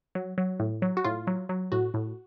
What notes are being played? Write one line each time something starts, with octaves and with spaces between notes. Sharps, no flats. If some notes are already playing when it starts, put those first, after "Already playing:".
F#3
F#3
A2
F#3
F#4
A2 F4
F#3
F#3
A2 F#4
A2